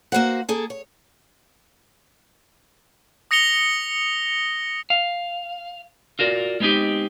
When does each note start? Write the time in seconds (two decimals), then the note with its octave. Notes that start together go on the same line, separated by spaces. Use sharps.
0.12 A#3 F#4 C5 F#5
0.49 A#3 G#4 A4
0.70 C#5
3.31 D#6 A#6 C#7 F7 G7
4.90 F5
6.19 F4 F#4 A#4 D5
6.60 G#3 B3 C4 D#4 G4